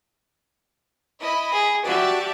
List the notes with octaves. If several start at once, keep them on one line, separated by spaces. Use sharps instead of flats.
E4 D#5 B5
G#4
F#4 G4 D5 E5 A5